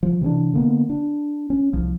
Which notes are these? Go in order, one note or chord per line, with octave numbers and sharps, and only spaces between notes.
F3
C3 E3 C4 D4
D3 A#3 B3
D4
C#4
C2 F3